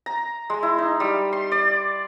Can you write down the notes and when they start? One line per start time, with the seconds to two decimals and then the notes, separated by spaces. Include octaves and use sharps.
0.06 A#5
0.50 G#3
0.63 E4
0.78 D#4
1.00 G3
1.33 C6
1.52 D5